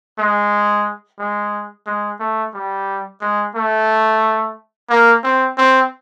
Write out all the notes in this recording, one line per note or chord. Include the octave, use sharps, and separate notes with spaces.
G#3
G#3
G#3
A3
G3
G#3
A3
A#3
C4
C4